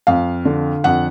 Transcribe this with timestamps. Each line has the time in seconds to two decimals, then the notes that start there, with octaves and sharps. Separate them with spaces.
0.07 F2 F5
0.45 D3
0.84 F2 F#5